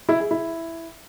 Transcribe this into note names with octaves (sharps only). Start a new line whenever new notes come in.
E4
G#4
E4